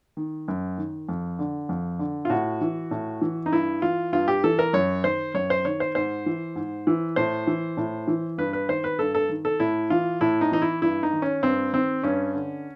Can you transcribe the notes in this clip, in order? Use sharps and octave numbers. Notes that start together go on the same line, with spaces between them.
D#3
F#2
D#3
F2
D3
F2
D3
F4
A2 F#4
E3
A2
E3
D#4
G2 E4
E3 F4
G2 F4
G4
E3 A4
A#4
F#2 C#5
D#3 C5
F#2 C#5
C5
D#3 C#5
C5
G#2 C5
E3
G#2
E3
A2 C5
E3
A2
E3
G2 B4
B4
D#3 C5
B4
G2 A4
A4
D#3
A4
A2 E4
E3 F4
A2 E4
D#4
E3 D#4
E4
G2 E4
D#4
D#3
C#4
G2 C4
D#3 C4
G2 C#4
D3